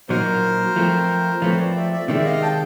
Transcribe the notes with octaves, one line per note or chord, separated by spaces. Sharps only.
A#2 F#3 A#3 D#4 A#4 C5
F3 A3 C4
F3 A3 C4 B4 C#5
C5 D5
D5 E5
D5 E5
C3 D#3 G#3 C4 D5 E5
D#5 F5
G5 A5